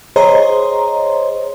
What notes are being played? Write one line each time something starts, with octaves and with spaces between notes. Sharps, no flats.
G#4 C5 C#5 D#5 A#5 C6